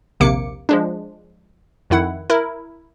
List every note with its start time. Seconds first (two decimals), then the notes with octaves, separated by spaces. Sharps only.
0.20 A#1 D#2 C3 A#3 D6 C#7
0.69 F3 G#3 D4
1.90 F2 D#3 E4 F#5
2.30 E4 A#4